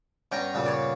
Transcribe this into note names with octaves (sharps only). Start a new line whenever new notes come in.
G2 B3 C#4 G5 A#5
G2 A#2 C#3
C#5 D5